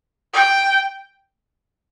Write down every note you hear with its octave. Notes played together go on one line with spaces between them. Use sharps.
G5